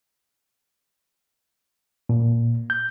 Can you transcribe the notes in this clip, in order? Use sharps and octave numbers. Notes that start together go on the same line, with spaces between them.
A#2
G6